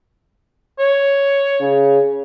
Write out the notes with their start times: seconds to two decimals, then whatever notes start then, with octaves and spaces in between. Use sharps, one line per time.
0.79 C#5
1.60 C#3